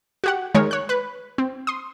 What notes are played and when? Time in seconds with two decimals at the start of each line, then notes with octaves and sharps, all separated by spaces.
0.24 F#4 G4 F#5
0.55 D#3 G#3 A#4 C#5
0.71 C#5 F#6
0.89 B4
1.38 C4
1.67 C6 D#6